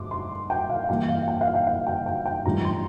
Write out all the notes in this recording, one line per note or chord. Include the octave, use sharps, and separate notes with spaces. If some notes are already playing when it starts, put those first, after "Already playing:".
Already playing: G2 A3 C6 D6
C6
G5
F5
G2 E3 A#3 G5
F5
G5
F5
G5
F5
G5
G5
G5
A1 G2 F3 A#5
C6